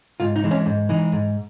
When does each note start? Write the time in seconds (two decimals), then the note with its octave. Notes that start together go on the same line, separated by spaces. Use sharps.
0.20 G#2 F4
0.36 D#4
0.44 E3 G#3
0.51 C#4
0.66 G#2
0.89 E3 G#3 D#4
1.12 G#2